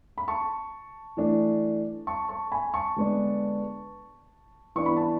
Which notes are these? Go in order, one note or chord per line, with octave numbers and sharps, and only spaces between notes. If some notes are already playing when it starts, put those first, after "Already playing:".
B5
A5 C#6
E3 A3 D4
A5 C#6
A5 C#6
G#5 B5
A5 C#6
D3 G#3 B3 D4
E3 B3 D4 C#6
B5
A5